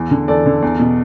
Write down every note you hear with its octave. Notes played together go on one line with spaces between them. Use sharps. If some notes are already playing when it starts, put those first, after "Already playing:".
Already playing: E2
D3
E2 A4 D5
D3
E2
B2